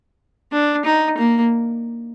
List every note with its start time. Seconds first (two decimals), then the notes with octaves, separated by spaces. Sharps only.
0.52 D4
0.85 D#4
1.18 A#3